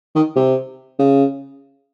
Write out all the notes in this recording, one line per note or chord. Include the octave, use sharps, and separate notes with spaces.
D#3
C3
C#3